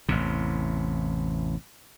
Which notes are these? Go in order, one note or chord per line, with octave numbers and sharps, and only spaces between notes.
A1 E2 C3